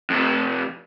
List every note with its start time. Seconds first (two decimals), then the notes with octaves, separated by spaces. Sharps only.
0.10 F2 C3